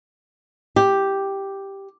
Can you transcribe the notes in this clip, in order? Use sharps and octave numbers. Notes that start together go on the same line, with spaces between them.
G4